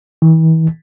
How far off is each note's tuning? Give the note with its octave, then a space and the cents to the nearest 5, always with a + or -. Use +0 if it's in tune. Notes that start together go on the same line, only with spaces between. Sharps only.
E3 -40